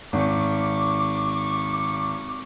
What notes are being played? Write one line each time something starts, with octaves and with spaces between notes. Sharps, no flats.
G#1 C#6 D6